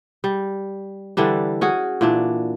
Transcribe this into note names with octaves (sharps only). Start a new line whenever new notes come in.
G3
D3 E3 G3 D4
C#4 F#4 G#4
A#2 E3 D4